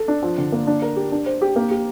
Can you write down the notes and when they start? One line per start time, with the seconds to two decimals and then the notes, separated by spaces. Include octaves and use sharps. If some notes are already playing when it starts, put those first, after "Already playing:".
Already playing: A4
0.08 D4
0.23 F3
0.38 D3
0.52 A#3
0.67 D4
0.82 A#4
0.96 G4
1.12 D4
1.26 C5
1.42 G4
1.56 A#3
1.71 G4